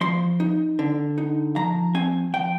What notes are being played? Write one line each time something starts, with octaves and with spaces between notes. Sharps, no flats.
F3 C6
D#4
D3
D#4
F3 A#5
C4 G#5
F3 G5